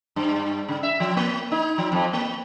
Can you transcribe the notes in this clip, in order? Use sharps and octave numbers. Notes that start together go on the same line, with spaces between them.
G2
C#3
E5
F3
A#3
D#4
F3
F2
A#3